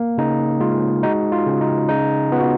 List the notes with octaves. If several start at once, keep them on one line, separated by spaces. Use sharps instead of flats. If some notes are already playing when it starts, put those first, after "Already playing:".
Already playing: A#3
C#3 D#4
G#3 F4
G#3 D#4 F#4
F4
C#3
D#4
C#3 D#4
B3 F4
F#4